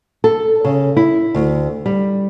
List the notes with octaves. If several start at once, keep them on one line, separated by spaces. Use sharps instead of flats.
A4
C#3
E4
D2
G3